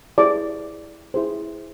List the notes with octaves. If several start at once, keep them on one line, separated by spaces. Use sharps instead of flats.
E4 G#4 C5 D5 D6
E4 G#4 C5